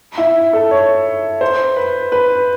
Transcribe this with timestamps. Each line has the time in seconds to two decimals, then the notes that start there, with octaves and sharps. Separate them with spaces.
0.18 E4
0.53 A4
0.71 C#5
1.41 C5
1.76 B4
2.12 B4